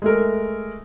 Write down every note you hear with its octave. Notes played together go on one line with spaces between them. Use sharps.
G#3 A3 A#4